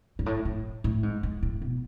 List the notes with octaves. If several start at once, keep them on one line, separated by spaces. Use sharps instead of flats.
G#2
A2
A2
A2
G#2
G#2
A2
B2